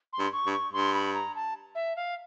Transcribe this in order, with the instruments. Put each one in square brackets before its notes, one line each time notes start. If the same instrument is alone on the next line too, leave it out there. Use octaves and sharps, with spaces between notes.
[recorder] C6
[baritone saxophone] G2
[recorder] C#6
[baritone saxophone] G2
[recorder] C#6
[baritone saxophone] G2 [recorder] C6
[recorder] B5
A#5
A5
E5
F5